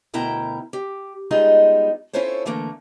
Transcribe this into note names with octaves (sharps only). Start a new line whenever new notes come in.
D2 B2 E4 A#4 G5 A#5
G4
G3 G#3 B3 D#4 F4 G#4
C#4 E4 F4 A4 C5 C#5
D3 E3 A3 A#3 A#4